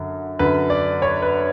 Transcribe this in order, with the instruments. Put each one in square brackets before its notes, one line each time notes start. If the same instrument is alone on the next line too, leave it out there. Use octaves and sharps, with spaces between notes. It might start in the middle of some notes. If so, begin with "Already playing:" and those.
Already playing: [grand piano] F#2 D3
F#2 D3 B4
D5
C#5
B4